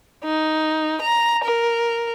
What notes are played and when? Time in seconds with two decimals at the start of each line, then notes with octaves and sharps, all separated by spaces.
0.24 D#4
1.02 A#5
1.44 A#4